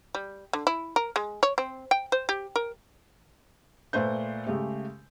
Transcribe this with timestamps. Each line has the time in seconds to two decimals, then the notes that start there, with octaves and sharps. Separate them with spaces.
0.15 G3
0.53 D3
0.67 E4
0.96 A#4
1.16 G#3
1.43 C#5
1.58 C4
1.91 G5
2.12 C5
2.29 G4
2.56 A#4
3.93 A#2 A3 B4 C5 G6
4.47 C#3 G#3 A3 G4